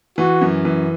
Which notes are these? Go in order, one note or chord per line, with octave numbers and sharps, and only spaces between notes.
E3 F#4
F#2
E3